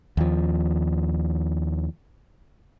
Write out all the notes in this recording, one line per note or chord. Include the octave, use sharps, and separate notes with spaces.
D#2 F3